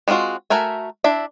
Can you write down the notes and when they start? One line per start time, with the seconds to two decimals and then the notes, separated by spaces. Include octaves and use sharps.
0.08 G#3 C4 D#4 F4 F#4
0.50 A3 F#4 A#4 E5 G#5
1.04 D4 E4 E5